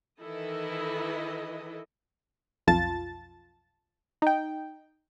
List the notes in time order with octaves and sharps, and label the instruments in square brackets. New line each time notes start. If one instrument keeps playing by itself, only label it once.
[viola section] D#3 E3 E4 A4 D#5
[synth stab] B1 F2 F4 A5 A6
D#4 G5